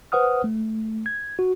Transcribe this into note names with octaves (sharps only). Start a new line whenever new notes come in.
B4 C5 F#5 D#6 F6
A3
G#6
F#4